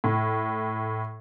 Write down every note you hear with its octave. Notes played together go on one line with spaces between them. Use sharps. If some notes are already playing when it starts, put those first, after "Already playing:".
A2